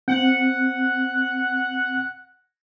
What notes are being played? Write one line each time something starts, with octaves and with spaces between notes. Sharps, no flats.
C4 F#5